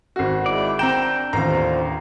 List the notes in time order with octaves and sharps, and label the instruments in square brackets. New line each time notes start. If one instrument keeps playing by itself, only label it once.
[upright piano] G#1 F#4
[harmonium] G#3 E4 [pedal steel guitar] D5
[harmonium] F2 [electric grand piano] C4 A#5 E7 [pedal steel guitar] G5
[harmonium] D4
[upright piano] A1 D#2 [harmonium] D3 F3 F4 [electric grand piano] A#5